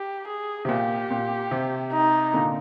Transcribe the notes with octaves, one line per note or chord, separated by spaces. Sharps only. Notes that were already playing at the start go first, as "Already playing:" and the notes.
Already playing: G4
G#4
C3
A#2 G4
A#2
C3
D#4
A#2 D3